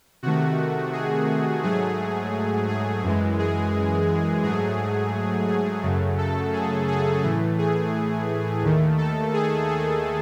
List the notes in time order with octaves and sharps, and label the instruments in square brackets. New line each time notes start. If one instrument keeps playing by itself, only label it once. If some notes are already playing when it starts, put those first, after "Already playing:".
[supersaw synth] C3 D#3 A3 F#4
G#4
G#2 F#3 A3 G#4
G#4
F#2 E3 G#3
G#4
G#2 F#3 A3 G#4
G#4
F#2 C#3 F#3 A3
A4
G#4
G#4
A2 E3 A3
G#4
D#2 D#3 A3
A4
G#4
G#4